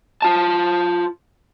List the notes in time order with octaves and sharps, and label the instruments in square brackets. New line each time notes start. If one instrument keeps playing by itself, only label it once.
[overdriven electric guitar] F4 A5